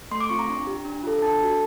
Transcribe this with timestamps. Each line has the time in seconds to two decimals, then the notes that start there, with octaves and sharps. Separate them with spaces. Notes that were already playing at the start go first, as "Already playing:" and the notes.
0.11 A3 C6
0.20 D6
0.29 C4 F4 C#6
0.39 A#5
0.48 D4
0.67 G4
0.85 D4
1.03 F4 A4
1.22 D4 A5
1.40 F#4 A4